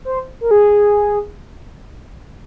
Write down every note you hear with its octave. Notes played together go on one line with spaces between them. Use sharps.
C5
A#4
G#4